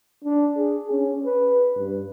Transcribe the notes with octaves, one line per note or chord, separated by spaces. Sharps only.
D4
G#4
C#4
B4
G2